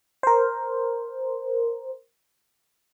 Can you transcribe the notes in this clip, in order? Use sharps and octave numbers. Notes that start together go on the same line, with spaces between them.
A#4 C5